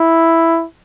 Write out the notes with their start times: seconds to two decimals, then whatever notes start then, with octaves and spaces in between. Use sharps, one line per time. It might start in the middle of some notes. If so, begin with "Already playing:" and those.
Already playing: E4